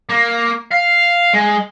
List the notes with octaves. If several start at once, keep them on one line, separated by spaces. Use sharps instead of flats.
A#3
F5
G#3